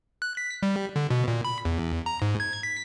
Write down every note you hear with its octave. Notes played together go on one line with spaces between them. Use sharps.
F#6
B6
G3
D3
B2
A#2
B5
E2
A#5
G#2
G#6
B6